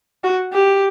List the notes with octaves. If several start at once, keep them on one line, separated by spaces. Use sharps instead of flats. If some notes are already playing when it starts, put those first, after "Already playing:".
F#4
G4